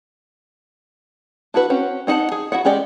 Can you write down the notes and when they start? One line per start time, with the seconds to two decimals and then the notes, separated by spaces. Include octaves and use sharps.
1.54 D4 E4 F#4 B4
1.70 C4 C#4 F#4
2.07 C4 D#4 G#4 F#5 A5
2.32 G#4
2.52 E4 F#4 E5 F#5
2.65 G#3 C#4 G4 D5 D#5